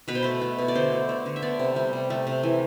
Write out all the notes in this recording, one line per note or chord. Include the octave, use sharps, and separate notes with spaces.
B2 B4
C5
A3 B4
A3
B2
D5
D3 C5
A3
A3
D3
E5
B3 D5
C3
G3
C3
A3
C3
E3